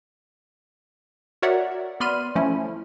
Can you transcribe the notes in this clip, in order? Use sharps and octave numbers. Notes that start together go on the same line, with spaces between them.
F#4 A#4 C#5 D5 E5 F#5
B3 D5 B5 C6 F6 D#7
F3 A3 C#4 E4